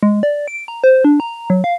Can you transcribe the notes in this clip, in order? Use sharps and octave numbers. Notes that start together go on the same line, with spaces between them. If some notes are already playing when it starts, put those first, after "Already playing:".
G#3
D5
D7
A#5
C5
D4
A#5
F#3
F5